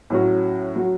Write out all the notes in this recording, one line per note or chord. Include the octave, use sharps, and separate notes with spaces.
A2 F#3 C#4 F#4
F#3 C#4 F#4